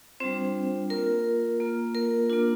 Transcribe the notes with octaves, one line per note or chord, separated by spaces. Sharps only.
G3 C4 D4 F4 C5
A#3 F4 A#4
A#3 F4
A#4
A#3 D4 F4